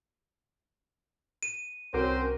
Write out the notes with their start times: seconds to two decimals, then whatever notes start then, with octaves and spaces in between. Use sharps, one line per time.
1.43 D#7
1.94 C2 C4 C#4 F#4 A#4 C5 D6 D7